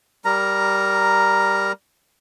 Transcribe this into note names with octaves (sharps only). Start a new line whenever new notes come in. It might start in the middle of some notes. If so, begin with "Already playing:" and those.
G3 A#4 A#5